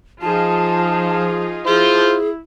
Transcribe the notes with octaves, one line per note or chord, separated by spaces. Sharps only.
F3 D#4 F4 G#4 A5
E4 F4 G#4 C5